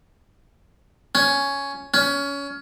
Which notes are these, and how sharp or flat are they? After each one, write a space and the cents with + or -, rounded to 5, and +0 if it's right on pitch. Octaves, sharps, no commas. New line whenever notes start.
C#4 +5
C#4 +20